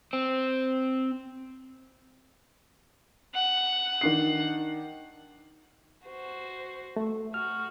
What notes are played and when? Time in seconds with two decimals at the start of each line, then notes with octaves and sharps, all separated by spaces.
0.13 C4
3.35 F#5
4.01 D#3 D4 C7
6.07 F#4 C5
6.96 A3
7.34 F#4 F6